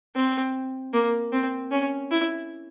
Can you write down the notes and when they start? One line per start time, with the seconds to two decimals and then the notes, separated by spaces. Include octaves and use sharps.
0.15 C4
0.94 A#3
1.32 C4
1.71 C#4
2.11 E4